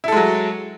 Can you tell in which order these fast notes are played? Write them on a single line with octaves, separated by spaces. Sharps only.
E4 A4 G#3 F#3